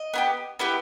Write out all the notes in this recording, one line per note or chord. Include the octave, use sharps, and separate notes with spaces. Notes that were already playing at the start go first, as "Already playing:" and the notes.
Already playing: D#5
B3 E4 G4
B3 E4 G4